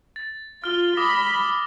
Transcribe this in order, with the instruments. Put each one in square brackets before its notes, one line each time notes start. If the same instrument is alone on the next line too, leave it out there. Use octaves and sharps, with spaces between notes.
[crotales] A6
[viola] F4 [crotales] F6 G7
[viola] B5 [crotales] D6 D#6 A#6